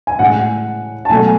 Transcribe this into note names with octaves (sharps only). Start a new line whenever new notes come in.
G#5
A2 G#3 F#5
A5
B2 F#3 A3 G#5